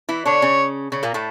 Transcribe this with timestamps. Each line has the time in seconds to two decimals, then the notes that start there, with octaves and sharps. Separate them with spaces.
0.09 E3 E4
0.26 D3 D4 C#5
0.42 C#3 C#4
0.92 C#3 C#4
1.03 A#2 A#3
1.14 A2 A3